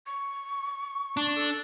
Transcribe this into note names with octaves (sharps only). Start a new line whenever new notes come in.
C#6
D4
A4